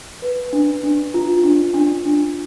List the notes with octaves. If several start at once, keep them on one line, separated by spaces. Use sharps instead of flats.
B4
D4
D4
F4
D4
D4
D4